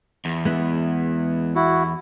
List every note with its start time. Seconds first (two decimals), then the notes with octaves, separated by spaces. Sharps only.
0.25 E2
0.45 G#3 B3 E4
1.55 E4 F#4